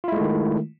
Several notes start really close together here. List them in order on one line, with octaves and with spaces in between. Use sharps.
F4 E4 G#3 A3 D#3